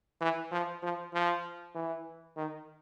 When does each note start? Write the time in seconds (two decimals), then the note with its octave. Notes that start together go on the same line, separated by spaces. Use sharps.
0.21 E3
0.52 F3
0.83 F3
1.14 F3
1.75 E3
2.37 D#3